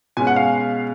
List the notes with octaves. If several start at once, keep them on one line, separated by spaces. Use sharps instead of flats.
B2 G#3 C#4 G#5
F#5
F5